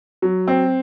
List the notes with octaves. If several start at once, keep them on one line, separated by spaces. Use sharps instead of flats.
F#3
C4